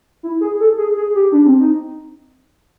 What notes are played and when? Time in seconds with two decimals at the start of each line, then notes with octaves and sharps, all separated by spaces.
0.23 E4
0.41 G#4
0.60 A4
0.77 G#4
0.97 G#4
1.15 G4
1.32 D4
1.46 C4
1.60 D#4